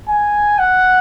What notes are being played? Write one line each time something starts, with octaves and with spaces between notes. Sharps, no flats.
G#5
F#5